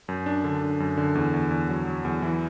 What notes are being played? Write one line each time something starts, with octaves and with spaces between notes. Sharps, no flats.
F#2
D4
D3
D4
F#2
D3
E2
E2
E2
F#3
F#3
E2
E3